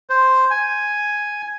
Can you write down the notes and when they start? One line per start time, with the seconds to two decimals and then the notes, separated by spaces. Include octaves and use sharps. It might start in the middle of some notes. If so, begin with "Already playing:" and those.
0.10 C5
0.51 G#5